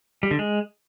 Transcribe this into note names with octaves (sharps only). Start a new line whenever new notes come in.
G3
D3
G#3